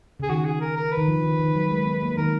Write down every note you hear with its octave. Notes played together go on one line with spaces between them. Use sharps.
C#3 G#4
D#3 F#4
G#4
A#4
A#4
B4
D#3
F3
D#3
D#3
F#3
G#3
B3
A#3
D#3 A#4